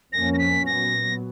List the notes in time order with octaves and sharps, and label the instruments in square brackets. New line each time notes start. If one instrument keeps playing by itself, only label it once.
[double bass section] F2 F3 A#3 C#4 [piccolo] A#6
[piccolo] A#6
B6
[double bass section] A#2 F#3 B3 [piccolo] A#6